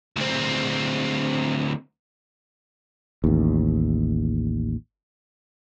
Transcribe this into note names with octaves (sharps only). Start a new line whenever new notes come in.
D2 C4
A1 D#2